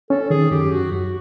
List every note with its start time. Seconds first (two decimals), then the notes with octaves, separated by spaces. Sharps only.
0.10 C#4 A4
0.30 D#3 G#4
0.51 F#2 G4
0.71 F#2 F#4
0.91 F#2 F#4